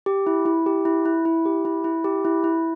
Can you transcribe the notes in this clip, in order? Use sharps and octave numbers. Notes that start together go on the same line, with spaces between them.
G4
E4
E4
G4
E4
E4
E4
G4
E4
E4
G4
E4
E4